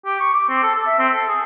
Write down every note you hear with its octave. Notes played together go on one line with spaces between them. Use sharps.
G4
C#6
D6
C4
A4
A4
E5
C4
A4
G#4